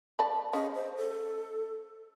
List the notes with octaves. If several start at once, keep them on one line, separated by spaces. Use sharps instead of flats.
D5 A5 B5
C#4 G#4 D#5
C5
A4